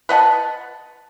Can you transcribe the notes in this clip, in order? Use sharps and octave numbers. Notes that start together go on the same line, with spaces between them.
B4 D#5 F#5 A5